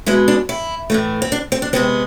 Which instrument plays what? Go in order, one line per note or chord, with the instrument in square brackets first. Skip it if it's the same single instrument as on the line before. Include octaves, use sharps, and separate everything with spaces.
[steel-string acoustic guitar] B2 G#3 B3 E4
D4
E4
A2 E3 A3
C4
D4
C4
D4
C3 G#3 B3 C4